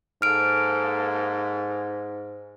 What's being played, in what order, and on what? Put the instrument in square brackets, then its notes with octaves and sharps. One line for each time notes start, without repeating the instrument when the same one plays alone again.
[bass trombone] G#2 [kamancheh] A#3 A4 [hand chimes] F6 D7